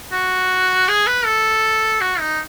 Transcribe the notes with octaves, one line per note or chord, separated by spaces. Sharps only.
F#4
G#4
B4
A4
F#4
D#4